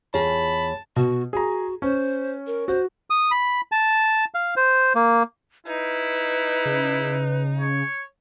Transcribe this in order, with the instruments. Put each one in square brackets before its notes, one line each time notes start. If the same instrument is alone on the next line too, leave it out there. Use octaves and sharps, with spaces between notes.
[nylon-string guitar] E2 F4 G#4 [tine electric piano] C#5 [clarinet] A5 [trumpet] B5
[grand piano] B2 [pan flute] F#4
[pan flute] F#4 [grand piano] G#4 A#5
[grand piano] C#4 [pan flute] C5
[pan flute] A#4
[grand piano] F#4 [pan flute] C5
[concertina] D#6
B5
A5
F5
C5
A#3
[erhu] D#4 [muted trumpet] E4 [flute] B4
[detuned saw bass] C#3
[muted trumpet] C#5